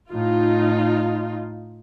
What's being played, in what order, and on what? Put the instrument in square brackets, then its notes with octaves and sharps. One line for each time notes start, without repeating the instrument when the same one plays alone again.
[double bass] A2 [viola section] D#4 F4